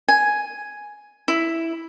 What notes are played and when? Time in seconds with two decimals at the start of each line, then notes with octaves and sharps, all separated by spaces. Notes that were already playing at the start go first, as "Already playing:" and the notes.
0.08 G#5
1.28 E4